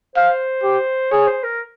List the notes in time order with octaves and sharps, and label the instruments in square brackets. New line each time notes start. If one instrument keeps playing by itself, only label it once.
[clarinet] C5 [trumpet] F5
[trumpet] G4
[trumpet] G#4 [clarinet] C#5
[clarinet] C5
A#4